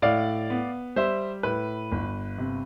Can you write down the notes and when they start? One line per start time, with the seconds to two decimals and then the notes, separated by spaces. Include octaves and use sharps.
0.02 A2 D5 F5
0.50 B3
0.96 G3 C5 E5
1.43 A2 B4
1.92 G1
2.38 C3